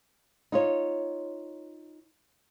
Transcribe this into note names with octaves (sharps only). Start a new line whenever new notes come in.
D#4 F4 C#5